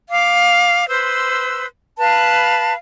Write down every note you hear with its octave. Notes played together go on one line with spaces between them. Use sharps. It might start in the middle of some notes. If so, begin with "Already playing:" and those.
F5 D6
B4 C5 C6 E6
B4 F5 A5 B5